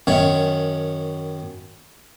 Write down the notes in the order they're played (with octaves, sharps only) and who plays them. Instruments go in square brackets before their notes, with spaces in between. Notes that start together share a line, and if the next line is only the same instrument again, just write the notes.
[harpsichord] F#2 D#3 C#4